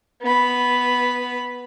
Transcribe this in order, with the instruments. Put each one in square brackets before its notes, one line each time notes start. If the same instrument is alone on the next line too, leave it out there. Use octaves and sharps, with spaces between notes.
[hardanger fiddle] B3 B5